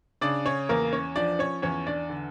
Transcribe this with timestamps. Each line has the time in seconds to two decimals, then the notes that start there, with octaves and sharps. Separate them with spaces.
0.21 C#3 D4 D5
0.45 C#4 C#5
0.69 E2 A#3 A#4
0.93 C#4 C#5
1.15 F3 D4 D5
1.39 C#4 C#5
1.62 E2 C#4 C#5
1.87 D4 D5
2.10 D3